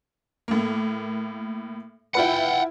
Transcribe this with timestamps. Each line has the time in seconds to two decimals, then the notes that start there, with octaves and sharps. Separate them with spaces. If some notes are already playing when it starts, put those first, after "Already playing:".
0.48 A2 A#3
2.15 E4 F4 B4 F#5 G5